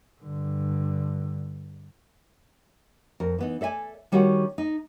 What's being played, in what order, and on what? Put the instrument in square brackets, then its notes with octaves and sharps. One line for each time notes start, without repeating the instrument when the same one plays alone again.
[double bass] G2 D3
[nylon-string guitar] F2 A#4
E3 B3 D#4
A4 D5 E5 G#5
D#3 G3 C#4 F#4 G#4 F#5
D#4